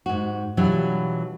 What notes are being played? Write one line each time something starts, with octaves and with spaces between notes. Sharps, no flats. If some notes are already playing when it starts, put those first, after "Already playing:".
G#2 F#4
B2 E3 F#3 G3 D4 F4